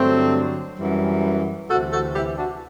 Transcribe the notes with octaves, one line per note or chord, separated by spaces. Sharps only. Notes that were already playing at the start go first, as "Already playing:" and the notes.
Already playing: G2 D3 F#3 A3 C4
F#2 E3 G3
D2 C3 E3 F#4 A4
F#4 A4
E4 G4
D4 F#4